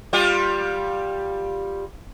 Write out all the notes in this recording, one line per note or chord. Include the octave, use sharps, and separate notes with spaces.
G3 F4 G4